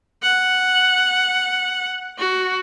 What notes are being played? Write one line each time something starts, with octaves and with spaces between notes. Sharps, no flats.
F#5
F#4